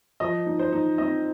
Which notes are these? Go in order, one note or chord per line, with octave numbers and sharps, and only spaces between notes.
F3 D#5
D#4
C5
D#4
C4 D#5